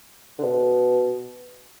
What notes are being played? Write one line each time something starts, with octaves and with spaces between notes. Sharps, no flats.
D3
B2